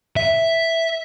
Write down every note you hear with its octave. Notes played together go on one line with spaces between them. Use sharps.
E5